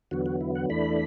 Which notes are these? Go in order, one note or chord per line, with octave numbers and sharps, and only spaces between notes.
E2 D3 F#3 B3 F#4
F#4
E4
F#5
E2 E3 A3 D4 B5